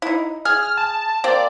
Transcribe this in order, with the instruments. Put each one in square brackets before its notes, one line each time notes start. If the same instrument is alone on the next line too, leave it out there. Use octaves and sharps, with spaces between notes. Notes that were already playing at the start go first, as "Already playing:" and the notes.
[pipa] D#4 E4
[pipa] G#4 [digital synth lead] F6
[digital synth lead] F6
A5
[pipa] A#3 C4 G4 [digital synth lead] D5